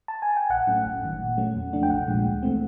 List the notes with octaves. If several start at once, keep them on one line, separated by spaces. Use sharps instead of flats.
A5
G#5
G5
A#1 F#5
A2 F#3 A3 C#4
G1
G2 D#3
A#2
F#3 A3 C#4
E2
C3 F3 A3 D4
G5
A#1 F#5
A#2 F3 G#3
D2
C3 E3 A3 C4